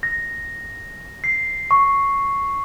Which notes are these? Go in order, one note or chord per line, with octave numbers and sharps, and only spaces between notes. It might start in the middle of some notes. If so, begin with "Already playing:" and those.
A#6
C7
C#6